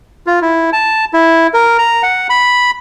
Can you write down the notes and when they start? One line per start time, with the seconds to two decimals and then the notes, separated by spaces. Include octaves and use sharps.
0.27 F4
0.42 E4
0.73 A5
1.13 E4
1.54 A#4
1.79 A#5
2.03 F#5
2.30 B5